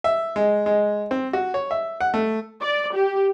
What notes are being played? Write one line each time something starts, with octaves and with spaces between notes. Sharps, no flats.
E5
G#3
G#3
C4
F#4
C#5
E5
F#5
A3
D5
G4